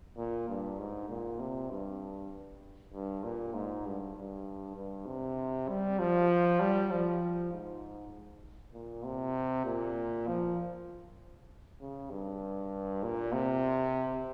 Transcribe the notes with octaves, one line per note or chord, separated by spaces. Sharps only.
A#2
G2
G#2
A#2
C3
G2
G2
A#2
G#2
G2
G2
G2
C3
G3
F3
G3
F3
G#2
A#2
C3
A#2
F3
C#3
G2
A#2
C3